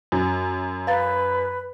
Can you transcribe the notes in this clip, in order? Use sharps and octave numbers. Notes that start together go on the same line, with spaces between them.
F#2
B4 F5 A#5 A6